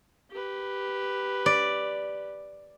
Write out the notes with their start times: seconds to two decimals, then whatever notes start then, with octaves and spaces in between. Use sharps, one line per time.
0.31 G4 B4
1.46 D5